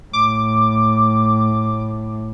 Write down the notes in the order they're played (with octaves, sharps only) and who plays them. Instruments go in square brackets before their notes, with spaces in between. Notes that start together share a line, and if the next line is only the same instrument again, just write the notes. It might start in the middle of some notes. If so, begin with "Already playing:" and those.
[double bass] A2 [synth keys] D6